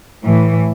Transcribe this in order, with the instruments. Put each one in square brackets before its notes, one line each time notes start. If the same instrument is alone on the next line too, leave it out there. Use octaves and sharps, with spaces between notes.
[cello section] A2 E3